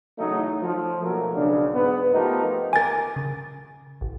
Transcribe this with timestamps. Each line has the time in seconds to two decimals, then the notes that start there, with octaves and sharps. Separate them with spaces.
0.18 E2 C#3 F#3 A3 D#4
0.62 F3
1.02 B2 F3 F#3 A3 A#3 A#4
1.35 B1 C#3 D4
1.74 G#2 B3
2.13 F3 A3 B3 D#4 G4 A#4
2.73 A#4 G#5 D6 A6
3.16 C#3
4.01 A1